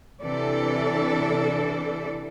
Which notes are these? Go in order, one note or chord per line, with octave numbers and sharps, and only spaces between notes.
C3 E3 D4 A4 D5